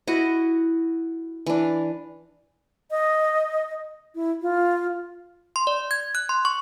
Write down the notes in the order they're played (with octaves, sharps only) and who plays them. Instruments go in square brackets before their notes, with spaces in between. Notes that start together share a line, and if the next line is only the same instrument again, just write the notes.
[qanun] E4 F#4 D#5
E3 D4
[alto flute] D#5
E4
F4
[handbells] C6
D5
G#6
F#6
C6
C#6